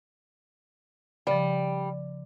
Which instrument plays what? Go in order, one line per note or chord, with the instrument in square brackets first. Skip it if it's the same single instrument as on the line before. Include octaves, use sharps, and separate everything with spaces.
[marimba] C#3 F3 [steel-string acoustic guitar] G3